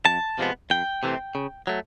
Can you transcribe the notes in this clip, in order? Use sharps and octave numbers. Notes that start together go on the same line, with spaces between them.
F2 A5
C3 F3 G#3 B3
F2 G5
C3 E3 A3 C4
C#3
F#3 A3